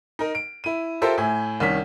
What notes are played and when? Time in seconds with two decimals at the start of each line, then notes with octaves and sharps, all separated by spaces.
0.19 D#4 A#4
0.35 D7
0.64 E4 D#7
1.02 F4 G4 A4 A#4 C5 E5
1.18 A2 E5 G#5
1.60 C2 D#3 C#4 B6